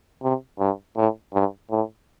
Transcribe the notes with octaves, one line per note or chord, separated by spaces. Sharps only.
C3
G2
A2
G2
A2